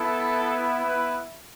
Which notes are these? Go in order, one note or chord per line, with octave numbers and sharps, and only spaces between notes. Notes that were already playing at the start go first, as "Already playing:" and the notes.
Already playing: B3 E4 A4
B3 B4